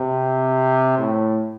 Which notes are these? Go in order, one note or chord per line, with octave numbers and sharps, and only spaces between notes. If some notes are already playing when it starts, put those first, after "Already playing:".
Already playing: C3
A2